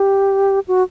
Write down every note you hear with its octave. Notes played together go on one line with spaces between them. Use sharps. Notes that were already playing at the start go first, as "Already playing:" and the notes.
Already playing: G4
F#4